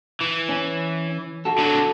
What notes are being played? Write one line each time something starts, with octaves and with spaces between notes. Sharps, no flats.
E3
C#4
F#4 A4
D3 F#3